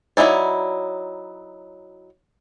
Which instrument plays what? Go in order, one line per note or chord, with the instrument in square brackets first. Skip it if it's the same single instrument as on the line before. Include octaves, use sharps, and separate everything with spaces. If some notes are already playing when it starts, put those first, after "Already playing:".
[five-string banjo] F#3 C#4 D#4 E4 D5